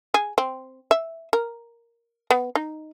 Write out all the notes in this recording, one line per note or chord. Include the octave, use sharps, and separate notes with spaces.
G#4
C4
E5
A#4
B3
D#4